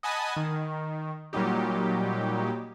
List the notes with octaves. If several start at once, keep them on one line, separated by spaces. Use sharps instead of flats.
D#5 F#5 G#5 A5 B5 D#6
D#3
A#2 F#3 G3 D#4 G4